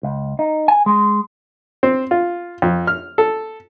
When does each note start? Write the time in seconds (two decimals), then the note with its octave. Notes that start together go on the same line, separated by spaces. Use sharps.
0.03 C#2
0.39 D#4
0.68 G#5
0.86 G#3
1.83 C4
2.11 F4
2.62 F2
2.87 F6
3.18 A4